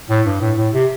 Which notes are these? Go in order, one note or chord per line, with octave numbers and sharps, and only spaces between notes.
A2
G2
A2
A2
C3